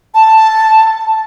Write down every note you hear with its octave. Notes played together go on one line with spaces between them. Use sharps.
A5